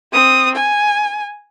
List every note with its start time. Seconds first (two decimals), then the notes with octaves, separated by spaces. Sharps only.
0.13 C4 D#6
0.55 G#5